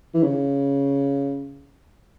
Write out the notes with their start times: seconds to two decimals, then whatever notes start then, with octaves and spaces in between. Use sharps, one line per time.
0.14 E3
0.23 C#3